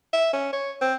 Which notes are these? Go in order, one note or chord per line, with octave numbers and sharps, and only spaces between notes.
E5
C#4
C#5
C4